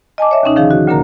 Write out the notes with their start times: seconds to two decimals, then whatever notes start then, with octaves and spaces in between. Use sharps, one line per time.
0.18 D#5 G#5 A5 D6
0.31 C#5 E5
0.43 D#2 C3 C#4 D#4
0.56 D3 D#3 F3 G#4 F5
0.71 F#4
0.87 D2 A#2 D3 A#3 A#4 A#5